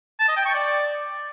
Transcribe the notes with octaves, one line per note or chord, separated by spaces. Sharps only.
A5
D#5
G5
C#6
D5